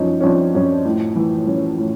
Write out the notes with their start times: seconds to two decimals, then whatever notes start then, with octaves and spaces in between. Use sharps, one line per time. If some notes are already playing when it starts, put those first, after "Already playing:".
Already playing: F#2 F3 C#4 D#4
0.20 C#4
0.24 F3 C4 D4
0.55 F#2 C#4
0.85 A2
1.16 E3
1.47 E3 C#4
1.78 A2